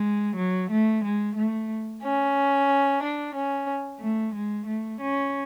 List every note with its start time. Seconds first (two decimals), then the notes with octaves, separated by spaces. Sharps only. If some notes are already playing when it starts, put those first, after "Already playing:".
Already playing: G#3
0.36 F#3
0.69 A3
1.02 G#3
1.35 A3
2.02 C#4
3.01 D4
3.34 C#4
4.00 A3
4.34 G#3
4.66 A3
4.99 C#4